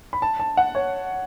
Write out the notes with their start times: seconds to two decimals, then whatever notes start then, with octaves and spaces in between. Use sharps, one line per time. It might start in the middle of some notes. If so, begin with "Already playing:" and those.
0.13 B5
0.22 A5
0.40 A5
0.57 F#5
0.75 C#5